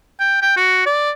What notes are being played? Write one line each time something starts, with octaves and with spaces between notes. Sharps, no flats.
G5
G5
F#4
D5